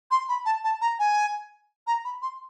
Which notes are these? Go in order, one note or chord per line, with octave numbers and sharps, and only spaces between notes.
C6
B5
A5
A5
A#5
G#5
A#5
B5
C6